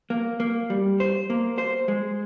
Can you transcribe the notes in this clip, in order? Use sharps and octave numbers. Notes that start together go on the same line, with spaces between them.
A#3
A#3
G3
C5
A#3
C5
G#3